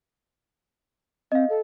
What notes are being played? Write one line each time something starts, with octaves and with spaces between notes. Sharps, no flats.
C4 D#5 F5
A4